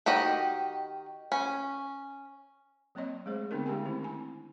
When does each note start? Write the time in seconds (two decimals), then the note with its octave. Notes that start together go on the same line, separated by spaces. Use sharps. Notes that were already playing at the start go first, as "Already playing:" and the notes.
0.06 D#3 F#4 G4 D#5
1.32 C#4
2.95 F#3 A#3 C4 C#5 D#5
3.26 G#3 A3 G#4 C5
3.51 D3 A3 B3 C4 D#4 A#4
3.66 G#3 C#4 D4 G4 G5 G#5
3.85 D#3 C4 E4
4.03 D4 G#5